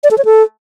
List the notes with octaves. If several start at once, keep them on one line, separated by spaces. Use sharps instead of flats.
D5
A4
C#5
A4